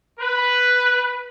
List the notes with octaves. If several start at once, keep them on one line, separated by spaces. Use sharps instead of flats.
B4